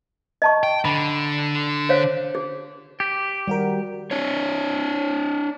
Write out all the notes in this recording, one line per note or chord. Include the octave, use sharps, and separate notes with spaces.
D#5 A5 C#6
G5
D3 B5
C5 C#5 F5
G#4
G4 B6
D#3 G3 F#4 A#4
D4 C#5